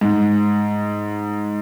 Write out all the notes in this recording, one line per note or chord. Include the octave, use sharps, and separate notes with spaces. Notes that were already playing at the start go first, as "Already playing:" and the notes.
G#2